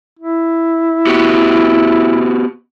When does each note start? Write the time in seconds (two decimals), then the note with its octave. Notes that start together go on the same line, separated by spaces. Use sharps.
0.19 E4
1.07 B3 F#4 G4